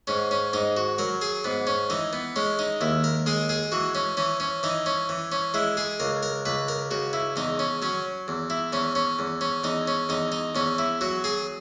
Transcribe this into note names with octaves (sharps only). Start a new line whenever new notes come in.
G#2 C#4
C#4
G#2 D#4
F#4
F#3 A#4
G#4
G#2 B3
C#4
E3 D#4
B3
G#3 C#4
D#4
D#2 E4
A#4
G#3 G#4
G#4
E3 F#4
C#4
E3 C#4
C#4
E3 D#4
C#4
E3
C#4
G#3 E4
G#4
C#2 A#4
A#4
C#2 B4
A#4
C#3 F#4
E4
E2 D#4
C#4
F#3 C#4
E2
E4
E2 C#4
C#4
E2
C#4
E2 D#4
C#4
E2 D#4
D#4
E2 C#4
E4
F#3 F#4
G#4